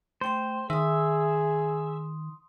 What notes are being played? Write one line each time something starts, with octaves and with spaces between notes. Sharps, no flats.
A3 C5 G5 C6
D#3 G#4 E5 C6 D#6